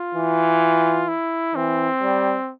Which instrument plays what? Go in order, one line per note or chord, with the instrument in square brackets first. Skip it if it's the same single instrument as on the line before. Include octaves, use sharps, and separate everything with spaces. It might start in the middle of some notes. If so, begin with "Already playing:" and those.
Already playing: [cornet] F4
[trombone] E3
[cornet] E4
[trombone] E3 [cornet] C4
[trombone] G3